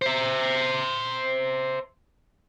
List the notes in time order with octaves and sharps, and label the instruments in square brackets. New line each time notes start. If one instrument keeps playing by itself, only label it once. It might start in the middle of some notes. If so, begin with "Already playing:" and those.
[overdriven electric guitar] C5 E5